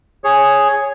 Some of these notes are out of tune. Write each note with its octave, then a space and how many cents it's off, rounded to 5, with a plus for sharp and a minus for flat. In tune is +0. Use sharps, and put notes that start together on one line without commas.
G#4 +0 C#5 +0